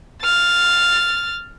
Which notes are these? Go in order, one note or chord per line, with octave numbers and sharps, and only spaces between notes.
F6 A6